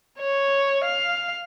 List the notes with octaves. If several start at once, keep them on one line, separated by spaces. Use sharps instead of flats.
C#5
F5